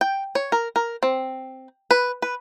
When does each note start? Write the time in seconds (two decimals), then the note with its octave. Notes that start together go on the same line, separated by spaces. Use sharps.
0.01 G5
0.35 C#5
0.52 A#4
0.76 A#4
1.03 C4
1.91 B4
2.22 B4